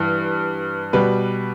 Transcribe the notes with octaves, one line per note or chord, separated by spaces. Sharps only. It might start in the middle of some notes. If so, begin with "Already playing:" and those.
Already playing: G2 E3
B2 G3 B4